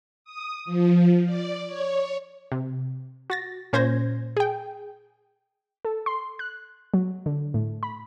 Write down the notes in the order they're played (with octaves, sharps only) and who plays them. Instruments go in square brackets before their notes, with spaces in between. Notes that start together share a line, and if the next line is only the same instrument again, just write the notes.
[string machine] D#6
F3
D5
C#5
[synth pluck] C3
F#4 A6 A#6
A#2 C#4 C5 G6 G#6 A#6
G#4 G5
[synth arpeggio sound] A4
C6
F#6
F#3
D3
A2
B5